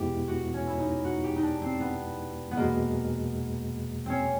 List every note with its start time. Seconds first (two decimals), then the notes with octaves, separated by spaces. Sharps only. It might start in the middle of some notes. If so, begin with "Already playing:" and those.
Already playing: E2 B2 G#3 B3 E4 G4
0.28 F#4
0.54 C#4
0.67 E4
0.79 D#4
1.05 F#4
1.23 G4
1.36 D#4
1.42 D4
1.62 C4
1.80 B3
2.51 B3
2.57 E2 B2 G#3 A#3
4.06 C4 C#4